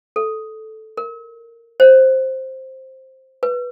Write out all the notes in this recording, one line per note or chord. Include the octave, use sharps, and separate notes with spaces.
A4
A#4
C5
B4